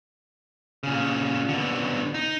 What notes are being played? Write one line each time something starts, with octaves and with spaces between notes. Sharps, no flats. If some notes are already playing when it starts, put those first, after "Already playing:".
A#2 C#3
B2 D3
D#4